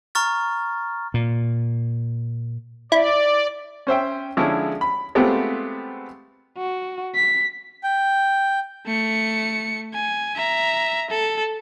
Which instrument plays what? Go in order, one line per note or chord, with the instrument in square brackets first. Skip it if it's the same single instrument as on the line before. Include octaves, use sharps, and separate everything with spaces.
[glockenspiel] A#5 C#6 F6 A6
[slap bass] A#2
[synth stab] E4 [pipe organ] D5
[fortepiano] C#4 C5 E5 G5
D3 F3 G#3 C#4 E4 G#4
B5
G#3 A3 B3 C4 F4 G4
[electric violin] F#4
B6
[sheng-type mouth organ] G5
[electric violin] A3 C#7
G#5
E5 A#5
A4